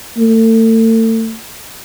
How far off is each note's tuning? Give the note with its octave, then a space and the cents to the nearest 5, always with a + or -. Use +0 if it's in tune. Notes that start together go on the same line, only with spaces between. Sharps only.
A3 +35